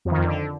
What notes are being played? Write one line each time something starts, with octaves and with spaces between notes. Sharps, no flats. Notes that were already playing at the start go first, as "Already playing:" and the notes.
F2
D#3
F2
D3